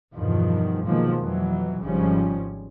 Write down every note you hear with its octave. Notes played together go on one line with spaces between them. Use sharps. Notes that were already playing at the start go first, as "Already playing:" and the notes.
E2 G2 B2 D#3 F3
B2 D#3 F3 F#3 G#3 A#3
F2 B2 E3 F#3
G#1 C#3 F3 G3 C#4